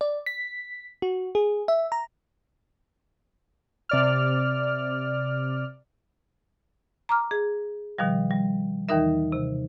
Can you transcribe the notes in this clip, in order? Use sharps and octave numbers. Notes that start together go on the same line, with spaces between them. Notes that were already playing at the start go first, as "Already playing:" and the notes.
D5
B6
F#4
G#4
E5
A#5
C3 D5 F6
A#5 D6 F6
G#4
B2 D#3 F3 G3
G3
D#2 D#3 E3 D#4 A#4 E5
C3